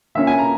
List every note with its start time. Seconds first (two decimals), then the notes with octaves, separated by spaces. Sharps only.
0.15 A#2 A#3 C#4 E5
0.27 G#5
0.39 A#5